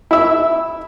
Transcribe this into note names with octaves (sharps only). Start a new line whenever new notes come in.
E4 E5